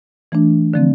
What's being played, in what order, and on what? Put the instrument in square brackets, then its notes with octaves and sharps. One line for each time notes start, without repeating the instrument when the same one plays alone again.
[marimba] E3 A3 D4
D3 F3 A3 C4